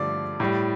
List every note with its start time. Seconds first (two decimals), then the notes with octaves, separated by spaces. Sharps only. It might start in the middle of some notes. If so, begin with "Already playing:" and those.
Already playing: G2 D3 F3 A3 D5
0.40 A2 G3